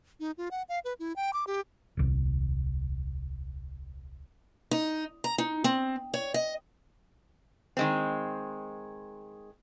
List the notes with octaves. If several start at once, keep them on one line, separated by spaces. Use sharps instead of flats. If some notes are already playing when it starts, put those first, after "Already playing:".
D#4
F4
F#5
F5
B4
E4
G5
D6
G4
D#1 C2
D#4
A#5
D#4
C4
C#5
D#5
D#3 G#3 C4